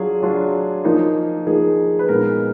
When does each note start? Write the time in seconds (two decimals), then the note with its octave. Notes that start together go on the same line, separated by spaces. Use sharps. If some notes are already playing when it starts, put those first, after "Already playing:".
Already playing: F#3 D4 F4 G#4
0.22 F#3 D4 F4
0.84 F3 A#3 D#4
1.47 F3 A#3 D#4 G#4
1.99 B4
2.09 A#2 G#3 B3 D#4 A#4